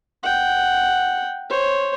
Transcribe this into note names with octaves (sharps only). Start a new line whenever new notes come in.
F#5 G5
C5 C#5